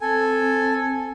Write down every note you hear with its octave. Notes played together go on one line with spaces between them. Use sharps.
C4 A4 G#5